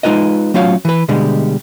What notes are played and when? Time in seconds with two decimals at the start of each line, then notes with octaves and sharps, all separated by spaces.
0.03 G#3 D#4 F4 B4 D#5
0.54 F#3 A3 C#4 F4 C#5 F5
0.85 E3 B4
1.08 B2 D3 G3 G#3